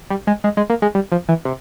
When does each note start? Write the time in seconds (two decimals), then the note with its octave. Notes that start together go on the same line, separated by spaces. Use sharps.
0.10 G3
0.27 G#3
0.44 G#3
0.57 G#3
0.70 A#3
0.82 G#3
0.95 G3
1.12 F3
1.29 E3
1.45 C3